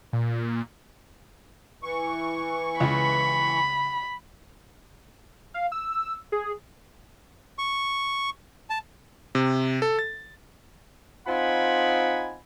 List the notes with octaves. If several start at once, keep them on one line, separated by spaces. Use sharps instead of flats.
A#2
E3 C#6
C#2 B5
F5
E6
G#4
C#6
A5
C3
A4
A6
C4 D#4 F4 F#5 G#5 B5